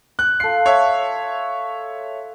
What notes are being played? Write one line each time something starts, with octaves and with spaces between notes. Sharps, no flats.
F#6
F4 A4 C7
C#5 E5